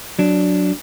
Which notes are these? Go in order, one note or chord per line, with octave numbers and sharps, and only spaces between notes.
F#3 D4